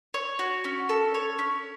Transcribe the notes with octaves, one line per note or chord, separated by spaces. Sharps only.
C#5
F#4
C#4
A4
C#5
C#4